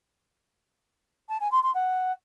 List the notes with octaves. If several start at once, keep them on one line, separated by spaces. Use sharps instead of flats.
A5
G#5
C6
C6
F#5